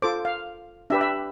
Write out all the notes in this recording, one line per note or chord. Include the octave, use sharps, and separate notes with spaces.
F4 A4 C5 D6
F5
D4 G4 B4 E5
E5